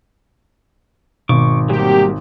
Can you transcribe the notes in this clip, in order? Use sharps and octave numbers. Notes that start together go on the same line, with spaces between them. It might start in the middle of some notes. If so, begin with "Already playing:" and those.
G#1 B2 C#6 D6
C3 F#3 G3 A#3 G4